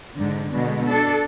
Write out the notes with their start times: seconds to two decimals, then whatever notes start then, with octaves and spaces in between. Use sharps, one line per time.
0.16 G#2 D3
0.52 B2 D3 G#3
0.88 D4 A4